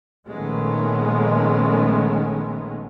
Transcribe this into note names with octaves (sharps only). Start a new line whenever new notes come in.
A#1 D#3 G#3 A3 B3 C#4